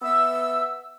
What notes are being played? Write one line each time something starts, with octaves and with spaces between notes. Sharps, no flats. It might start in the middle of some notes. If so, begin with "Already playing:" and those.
B3 E5 E6